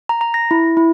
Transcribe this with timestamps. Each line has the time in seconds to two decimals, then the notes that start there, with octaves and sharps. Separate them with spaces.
0.09 A#5
0.21 A#5
0.34 A#6
0.51 E4
0.77 E4